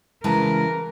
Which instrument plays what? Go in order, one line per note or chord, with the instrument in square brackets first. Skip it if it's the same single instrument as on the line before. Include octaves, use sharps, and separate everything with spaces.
[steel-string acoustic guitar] C#3 G#3 B4 [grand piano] E3 A5 A#5 [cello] A#4